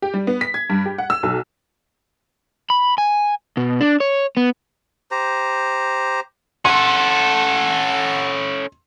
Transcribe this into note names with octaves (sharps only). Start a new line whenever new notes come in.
G4
G3
B3
B6
G#6
G2
G4
F#5
E6
B1
B5
G#5
B2
D4
C#5
B3
G4 C5 A#5
C#4 A4 F#5 C6